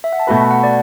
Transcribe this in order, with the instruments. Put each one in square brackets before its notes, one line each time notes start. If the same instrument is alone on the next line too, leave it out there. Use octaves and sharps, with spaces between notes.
[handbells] E5
F#5
A5
[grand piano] B2 A3 F#4 B4 [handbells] B5
[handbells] A5
F#5
D5